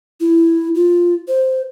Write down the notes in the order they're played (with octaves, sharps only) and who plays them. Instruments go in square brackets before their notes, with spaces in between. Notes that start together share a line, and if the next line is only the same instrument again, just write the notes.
[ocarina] E4
F4
C5